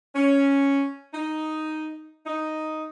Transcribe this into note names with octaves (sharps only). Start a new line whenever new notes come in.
C#4
D#4
D#4